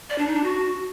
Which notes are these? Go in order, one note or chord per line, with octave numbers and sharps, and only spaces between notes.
D5
D4
D#4
D4
F#4